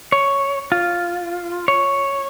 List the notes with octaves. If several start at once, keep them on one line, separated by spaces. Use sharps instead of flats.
C#5
F4
C#5